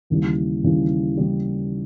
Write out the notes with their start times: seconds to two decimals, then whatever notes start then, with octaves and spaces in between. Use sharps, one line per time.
0.10 D#2 C#3 E3 G3
0.64 D#2 C#3 E3 G3
1.17 C#3 E3 G3